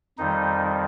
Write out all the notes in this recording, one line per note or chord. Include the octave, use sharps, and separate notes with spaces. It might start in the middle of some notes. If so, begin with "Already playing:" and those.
F2 D#3 G3 D#4